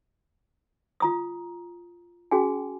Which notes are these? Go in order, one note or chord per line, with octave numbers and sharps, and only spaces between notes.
F4 A#5 D#6
C#4 F#4 G#4 G5 G#5